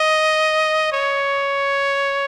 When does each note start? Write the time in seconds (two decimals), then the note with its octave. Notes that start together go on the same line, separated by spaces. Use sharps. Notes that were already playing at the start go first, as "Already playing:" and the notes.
Already playing: D#5
0.92 C#5